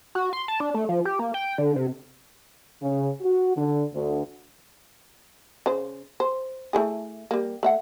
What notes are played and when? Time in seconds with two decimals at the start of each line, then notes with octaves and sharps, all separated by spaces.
0.15 F#4
0.33 C6
0.48 A5
0.60 D4
0.74 A3
0.89 F3
1.05 G4
1.19 A#3
1.34 G5
1.58 D3
1.76 C3
2.82 C#3
3.22 F#4
3.56 D3
3.93 D2
5.66 C#3 C5
6.20 C5
6.73 A3 E4 G#4
7.31 G3 A#3
7.63 A3 E5 F#5